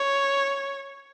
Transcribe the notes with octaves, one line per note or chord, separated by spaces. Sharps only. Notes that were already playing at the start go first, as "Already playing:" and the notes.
Already playing: C#5